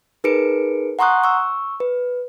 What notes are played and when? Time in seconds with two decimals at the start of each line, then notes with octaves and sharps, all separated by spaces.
0.24 D#4 G#4 A#4 B4 C#7 D7
0.99 F#5 A#5 C6 C#6 D#6 F#6
1.24 C#6 E6
1.80 B4